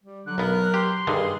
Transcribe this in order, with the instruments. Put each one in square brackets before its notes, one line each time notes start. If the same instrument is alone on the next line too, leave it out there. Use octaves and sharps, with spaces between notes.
[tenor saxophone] G3
[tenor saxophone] D3 [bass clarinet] F#3 [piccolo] F#6
[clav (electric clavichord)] B1 B3 [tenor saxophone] A#4
[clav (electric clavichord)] G4 [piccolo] C6
[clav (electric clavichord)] G2 D3 D#3 [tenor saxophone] G#4